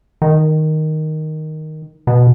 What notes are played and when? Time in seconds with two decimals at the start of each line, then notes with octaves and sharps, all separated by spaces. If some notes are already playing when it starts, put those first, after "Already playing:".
0.22 D#3
2.07 B2